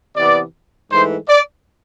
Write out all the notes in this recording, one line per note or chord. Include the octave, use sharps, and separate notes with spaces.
C3 E3 B3 D5
G#2 E3 A3 C5
D5